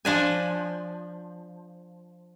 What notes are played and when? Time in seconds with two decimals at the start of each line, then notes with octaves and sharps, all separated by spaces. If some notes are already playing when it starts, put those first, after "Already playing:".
0.05 F3 D4 G#5